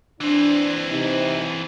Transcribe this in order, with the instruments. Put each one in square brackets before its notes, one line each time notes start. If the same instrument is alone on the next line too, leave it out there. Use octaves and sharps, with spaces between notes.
[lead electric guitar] E3 C4 [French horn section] D4
[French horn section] C3 D#4